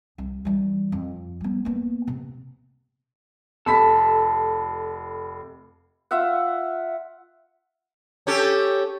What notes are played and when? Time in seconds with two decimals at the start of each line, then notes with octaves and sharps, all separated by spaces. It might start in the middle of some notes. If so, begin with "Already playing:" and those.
0.18 C2
0.45 E3 G3
0.92 F2
1.41 G3 B3
1.65 A#3 B3
2.07 C3
3.66 F1 A4 B5 B6
6.11 F4 E5 F#5
8.27 C#4 G4 A4